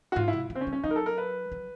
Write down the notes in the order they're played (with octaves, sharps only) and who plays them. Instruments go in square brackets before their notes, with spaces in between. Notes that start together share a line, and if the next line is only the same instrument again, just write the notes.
[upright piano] F#4
[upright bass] G#2 [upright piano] F4
[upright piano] E4
[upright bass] C3
C#3
[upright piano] C4
C#4
[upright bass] G3
[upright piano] C#4
[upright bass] F#3 [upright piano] D#4
[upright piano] A#4
A4
A#4
B4
[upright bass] F#3